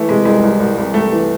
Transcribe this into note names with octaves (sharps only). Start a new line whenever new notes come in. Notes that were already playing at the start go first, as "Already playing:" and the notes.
Already playing: E3 A3
C3 G#3
C2 G#3
C2
C2
C2
C2 A3
E3